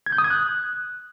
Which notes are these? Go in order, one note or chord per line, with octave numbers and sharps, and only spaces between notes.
G#6
G6
D#6
G#6
F#6